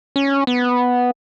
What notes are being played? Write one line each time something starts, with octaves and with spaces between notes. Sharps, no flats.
C#4
B3